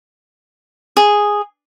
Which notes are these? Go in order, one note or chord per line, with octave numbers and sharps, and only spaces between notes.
G#4